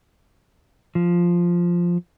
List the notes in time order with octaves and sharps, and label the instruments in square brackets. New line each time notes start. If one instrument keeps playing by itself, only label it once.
[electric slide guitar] F3